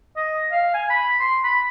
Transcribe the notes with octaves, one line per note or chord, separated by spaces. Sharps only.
D#5
F5
G#5
B5
C6
B5